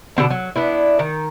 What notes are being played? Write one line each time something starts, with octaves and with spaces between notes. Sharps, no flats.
B2 D3 C4 A5
F#3
B3 D4 E4
D#3